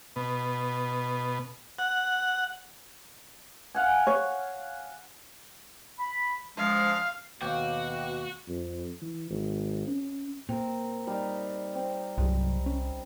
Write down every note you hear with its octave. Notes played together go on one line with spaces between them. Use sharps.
B2
F#5
F5 F#5 G#5
C#5
B5
F3 G#3 D4 F5
D#2 B2 F#4 F5 G5 D6
F2
E3
G#1
C#4
A#2 C4 A#4
G3 D#4 F5
C4
C2 G2 C3 F#3
C#4